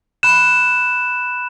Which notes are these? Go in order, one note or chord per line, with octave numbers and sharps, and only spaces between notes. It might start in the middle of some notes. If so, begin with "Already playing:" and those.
B5 F#6 E7